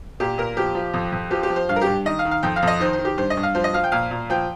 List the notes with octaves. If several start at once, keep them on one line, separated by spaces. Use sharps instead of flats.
A#2 G4
A#2 A#4
F3 G4
F3
F2
F2
F3 G4
G4
F3
C5
G2 F5
A#4
G4
G2
D#3 D#5
F5
D#3
F5
F2 G5
F5
F2
D#5
D#3 C5
C5
D#3
G4
G2 C5
D#5
G2
F5
F3 C5
D#5
F3 F5
G5
A#2 F5
A#2
F3 G5